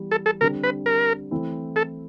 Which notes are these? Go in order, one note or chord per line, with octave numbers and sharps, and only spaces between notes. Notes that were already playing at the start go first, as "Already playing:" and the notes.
Already playing: E3 G3 B3
A4
A4
D3 G3 C4 A#4
B4
A#4
E3 A3 C4 E4
A4